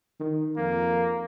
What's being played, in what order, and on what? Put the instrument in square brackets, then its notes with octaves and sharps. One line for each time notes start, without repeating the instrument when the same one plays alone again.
[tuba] D#3
[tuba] F2 [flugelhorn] A#3